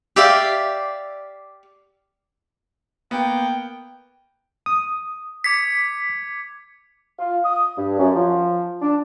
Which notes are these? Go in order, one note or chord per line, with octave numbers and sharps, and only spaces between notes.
G4 D5 E5 F5
A#3 B3 G5
D#6
D6 G#6 B6 C#7
F4
D#6
G2
F#2
F3
D4